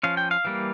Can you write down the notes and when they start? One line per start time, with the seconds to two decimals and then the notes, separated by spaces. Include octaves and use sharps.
0.03 F3 C#4 F5
0.17 G5
0.31 F5
0.45 E3 G3 A#3